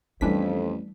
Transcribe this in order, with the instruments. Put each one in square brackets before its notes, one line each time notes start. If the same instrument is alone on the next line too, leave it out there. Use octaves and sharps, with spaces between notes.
[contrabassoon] A1 [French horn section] F2 [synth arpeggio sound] E3 D4 B6 [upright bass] G3 A3